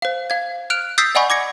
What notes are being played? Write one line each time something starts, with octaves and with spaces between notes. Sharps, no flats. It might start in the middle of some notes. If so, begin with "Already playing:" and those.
C5 F5
F5 G#6
F6 F#6 D7 F7
D#6 E6 G6 A6 B6 C7
D5 D#5 F#5 G#5 B5 C#6
D6 G#6 A#6 C#7